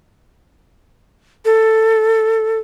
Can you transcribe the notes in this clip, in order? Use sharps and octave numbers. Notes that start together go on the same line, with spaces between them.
A4